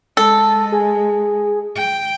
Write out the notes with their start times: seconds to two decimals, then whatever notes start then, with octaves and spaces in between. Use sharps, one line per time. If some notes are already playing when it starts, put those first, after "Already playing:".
0.17 G#3 A4
0.72 G#4
1.76 G5